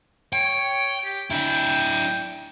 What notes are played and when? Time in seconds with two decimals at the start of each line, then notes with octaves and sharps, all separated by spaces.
0.33 C#5 G5
1.05 G4
1.30 D4 E4 G5